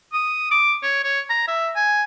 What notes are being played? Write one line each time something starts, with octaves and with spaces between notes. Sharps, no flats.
D#6
D6
C#5
C#5
A#5
E5
G#5